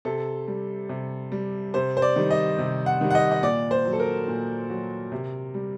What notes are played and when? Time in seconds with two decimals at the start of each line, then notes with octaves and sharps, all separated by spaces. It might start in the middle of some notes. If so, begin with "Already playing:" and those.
0.05 C3 A4
0.48 G3
0.89 C3
1.32 G3
1.74 C3 C5
1.97 C5
2.02 D5
2.16 D#3 G3
2.30 D#5
2.58 C3
2.86 F#5
3.01 D#3 G3
3.11 F#5
3.15 D#5
3.31 D#5
3.43 A#2 D5
3.71 C5
3.85 F#3
3.93 A4
4.00 A#4
4.28 A#2
4.69 F#3
5.12 C3
5.54 G3